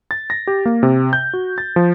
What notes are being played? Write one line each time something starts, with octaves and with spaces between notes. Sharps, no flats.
A6
A#6
G4
A#3
C3
G6
F#4
A6
F3